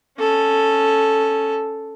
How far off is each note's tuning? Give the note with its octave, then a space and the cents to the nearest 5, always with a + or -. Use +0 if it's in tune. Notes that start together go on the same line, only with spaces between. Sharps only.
C#4 +0 A4 +0